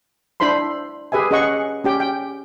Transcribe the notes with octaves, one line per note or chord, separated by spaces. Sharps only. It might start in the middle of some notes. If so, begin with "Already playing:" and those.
D4 E4 C5 B5 C6
G4 G#4 B4 E5 G#5
C#4 G#4 D#5 F#5 C#6
C#4 G4 G5
G5